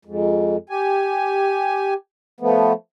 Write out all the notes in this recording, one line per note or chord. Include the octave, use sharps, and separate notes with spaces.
F2 G#2
G4 G#5
F3 A3 B3